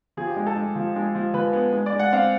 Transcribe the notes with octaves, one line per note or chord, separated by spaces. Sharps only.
F3 G#4
G4
G#3
A4
G#3
F3
G#3
F3
F3 B4
B3
G#3
D5
G#3
F#5
C4 F5